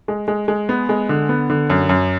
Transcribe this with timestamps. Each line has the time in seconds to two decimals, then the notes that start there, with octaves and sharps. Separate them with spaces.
0.08 G#3
0.28 G#3
0.48 G#3
0.69 B3
0.89 G#3
1.09 D3
1.29 B3
1.50 D3
1.70 F#2
1.89 F#2